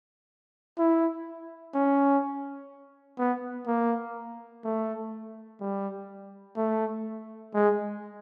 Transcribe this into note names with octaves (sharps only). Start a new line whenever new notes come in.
E4
C#4
B3
A#3
A3
G3
A3
G#3